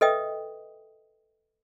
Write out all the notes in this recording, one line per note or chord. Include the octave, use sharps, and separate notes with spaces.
A4 B4 D#5 E5 G5 D#6